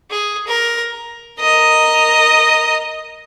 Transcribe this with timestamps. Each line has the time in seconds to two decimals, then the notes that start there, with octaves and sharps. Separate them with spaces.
0.10 G#4
0.47 A#4
1.40 A#4 D#5